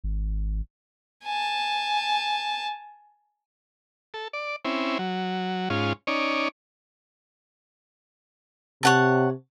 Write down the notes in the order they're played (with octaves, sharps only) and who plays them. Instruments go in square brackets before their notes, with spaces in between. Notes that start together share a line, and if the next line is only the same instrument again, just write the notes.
[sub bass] G#1
[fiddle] G#5 A5
[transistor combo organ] A4
D5
C4 C#4 E4
F#3
G#2 C#4 F4
C#4 D#4 C#5 D5
[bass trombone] C3 [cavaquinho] C#5 F#5 A5